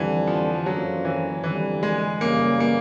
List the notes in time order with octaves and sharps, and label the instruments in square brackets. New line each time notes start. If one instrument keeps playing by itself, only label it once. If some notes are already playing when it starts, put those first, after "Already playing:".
Already playing: [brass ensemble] F2 D3 G3 [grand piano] E3
[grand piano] F3
[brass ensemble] F#2 D3 F3 A#3 C#4 [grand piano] F#3
[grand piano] E3
[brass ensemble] F2 D3 G3 [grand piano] E3
[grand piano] G#3
[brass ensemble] F#1 F#2 C#3 E3 G3 [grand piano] A#3
[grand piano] A#3